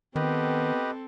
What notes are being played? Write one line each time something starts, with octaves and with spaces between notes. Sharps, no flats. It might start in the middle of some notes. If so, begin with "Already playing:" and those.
D#3 B3 C4 G4 A4 B4 D#5